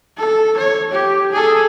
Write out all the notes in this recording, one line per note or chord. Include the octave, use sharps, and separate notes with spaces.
A4
C#5
G4
G#4 A4